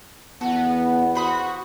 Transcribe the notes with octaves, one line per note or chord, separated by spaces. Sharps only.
E2 B3 F#4 A4 F#5
F#4 C5 B5 D#6